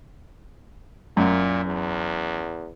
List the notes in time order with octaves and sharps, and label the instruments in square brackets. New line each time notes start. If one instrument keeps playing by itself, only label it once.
[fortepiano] F#2 [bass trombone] A#2
[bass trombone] E2